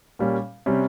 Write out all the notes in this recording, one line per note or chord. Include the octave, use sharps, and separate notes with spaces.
A#2 G3 A#3 C#4
C3 G3 C#4